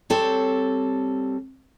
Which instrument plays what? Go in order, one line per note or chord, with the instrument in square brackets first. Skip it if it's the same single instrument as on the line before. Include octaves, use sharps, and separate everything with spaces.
[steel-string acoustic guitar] G3 C4 A4 C#5